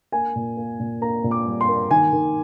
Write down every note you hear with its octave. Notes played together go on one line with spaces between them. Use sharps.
A#3 G#5
A#2
A#3
A#2
A#3 A#5
A#2
D6
G3
C6
A#3
D#3 G#5
D#3